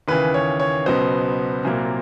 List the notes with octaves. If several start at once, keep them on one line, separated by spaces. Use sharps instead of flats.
D#2 C#3 E3 B4
C#5
C#5
C#2 B2 F#3 B3 C5
C2 A#2 F#3 A#3